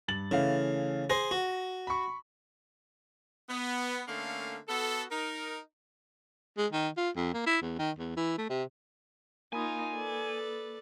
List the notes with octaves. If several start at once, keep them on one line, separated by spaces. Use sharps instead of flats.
G2 A6 F#7
C#3 E3 A3 F5
G#4 C5 A#6
F#4
B5 C#6
B3
D3 A3 A#3 C#4 F5
B3 F#4 A4
D#4 A#4
G#3
D#3
F4
F2
A#3
E4
E2
D#3
E2
E3
A3
C3
A#3 D#4 F4 A#4 G#5 B5 D#6
A4 B4 D5